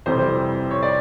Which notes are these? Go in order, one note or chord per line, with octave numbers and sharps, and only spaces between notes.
F2 C3 E3 G3 C5
C#5
D5